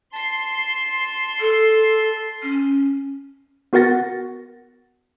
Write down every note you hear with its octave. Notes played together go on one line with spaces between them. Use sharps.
A5 C6 C7
A4
C#4
B3 F#4 A#4 F#5 A6 A#6